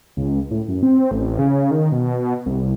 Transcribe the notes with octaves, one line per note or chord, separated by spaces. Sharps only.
C#2
A2
F#2
C4
A1
C#3
D#3
B2
C2